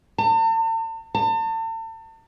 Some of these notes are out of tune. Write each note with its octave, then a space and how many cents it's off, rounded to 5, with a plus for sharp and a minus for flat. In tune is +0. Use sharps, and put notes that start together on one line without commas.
A5 +40
A5 +40